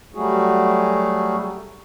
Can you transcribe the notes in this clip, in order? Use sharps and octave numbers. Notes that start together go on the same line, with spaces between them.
F#3 G3 A3 F#4 G#4